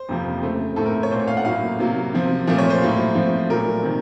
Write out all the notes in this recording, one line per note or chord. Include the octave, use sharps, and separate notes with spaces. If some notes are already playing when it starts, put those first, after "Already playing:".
Already playing: C5
F2 C3 F3 A#3
C#3 A3 C4
A2 A3 C4 A4
A#4
C#5
A#2 A3 C4 C5
C#5
F5
F#5
A2 F#3 A#3 F5
C3 F#3 A#3
C3 F3 C4
A#2 F3 A3 C4
C#5
C5
A2 F#3 A#3
A2 F3 C4
A#2 F#3 A3 A#4
C3 D#3